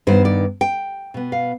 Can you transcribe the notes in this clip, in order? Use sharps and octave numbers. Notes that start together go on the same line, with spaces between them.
G2 D#3 B3 C5
D5
G5
B2 B3
F5